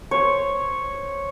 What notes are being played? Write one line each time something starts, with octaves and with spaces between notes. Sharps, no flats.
C5 C#5